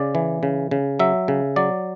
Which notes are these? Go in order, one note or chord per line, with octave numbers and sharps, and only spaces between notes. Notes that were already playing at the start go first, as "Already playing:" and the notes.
Already playing: C#3 D5
E3
C#3
C#3
F#3 E5
C#3
F#3 D5